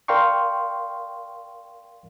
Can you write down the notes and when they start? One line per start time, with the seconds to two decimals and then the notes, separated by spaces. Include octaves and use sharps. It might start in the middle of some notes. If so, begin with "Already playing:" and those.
0.08 A#4 D5 F5 G5 C6 C#6